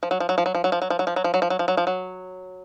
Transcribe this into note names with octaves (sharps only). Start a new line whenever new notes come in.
F3
F#3
F3
F#3
F3
F#3
F3
F#3
F3
F#3
F3
F#3
F3
F#3
F3
F#3
F3
F#3
F3
F#3
F3
F#3